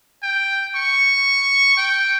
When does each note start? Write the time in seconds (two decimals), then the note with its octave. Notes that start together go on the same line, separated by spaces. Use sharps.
0.23 G5
0.76 C#6
1.78 G5